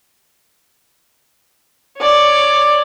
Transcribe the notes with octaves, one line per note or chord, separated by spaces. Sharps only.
C#5 D5